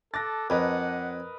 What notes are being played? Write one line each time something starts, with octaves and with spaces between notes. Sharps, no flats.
A4 A5 D6 F#6 A6 A#6
F2 A#4 B4 D#5 F#5